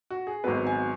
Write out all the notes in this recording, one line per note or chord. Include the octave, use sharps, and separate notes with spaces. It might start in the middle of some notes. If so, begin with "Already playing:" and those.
F#4
G#4
G#1 G#2 F#3 B3 B4
G#5